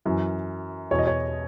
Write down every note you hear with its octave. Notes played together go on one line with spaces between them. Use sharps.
F#2 E3
E2 B2 C#5
D#5
C#5